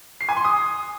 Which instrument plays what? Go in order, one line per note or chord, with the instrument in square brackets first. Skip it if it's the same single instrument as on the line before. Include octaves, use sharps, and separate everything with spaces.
[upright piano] C7
G#5
C6
D#6